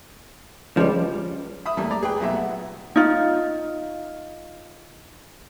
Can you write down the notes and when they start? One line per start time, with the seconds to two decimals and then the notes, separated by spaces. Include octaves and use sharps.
0.77 C#2 F3 G3
1.66 E5 B5 D#6
1.77 E2 G3 A3 A#3
1.91 D5 A#5 D6
2.03 G#4 B4 G5
2.20 B1 A#2 A3 B3 E5
2.35 F#5
2.96 D#4 F4